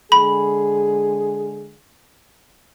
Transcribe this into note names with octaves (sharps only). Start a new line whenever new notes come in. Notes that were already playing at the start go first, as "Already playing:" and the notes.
D3 G#3 G#4 B5